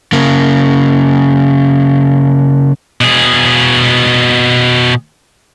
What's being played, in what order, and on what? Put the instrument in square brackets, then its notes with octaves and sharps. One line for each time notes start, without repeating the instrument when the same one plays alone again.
[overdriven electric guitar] C#3 A#3
[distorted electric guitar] B2 G#4